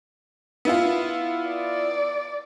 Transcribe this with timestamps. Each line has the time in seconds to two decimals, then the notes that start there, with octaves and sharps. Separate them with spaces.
0.65 B3 E4 F4
1.49 D5